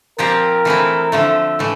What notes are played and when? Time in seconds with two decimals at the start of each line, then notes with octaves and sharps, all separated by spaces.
0.18 A#2 F3 C4 G4 A#4
0.65 E3 A3 C4 E4
1.12 D3 F3 A3 E5
1.59 A2 E3 A3